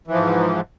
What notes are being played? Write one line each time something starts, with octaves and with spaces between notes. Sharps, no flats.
G#2 E3 F3